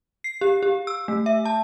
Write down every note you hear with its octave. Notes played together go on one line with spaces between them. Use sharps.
C7
G4
G4
E6
A3
E5
A5